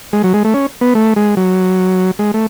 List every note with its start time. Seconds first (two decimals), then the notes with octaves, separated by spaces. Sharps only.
0.13 G#3
0.24 F#3
0.34 G#3
0.44 A3
0.54 C#4
0.81 B3
0.95 A3
1.16 G#3
1.37 F#3
2.19 G#3
2.34 A3